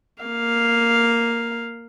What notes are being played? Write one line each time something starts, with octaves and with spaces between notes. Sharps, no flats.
A#3 F5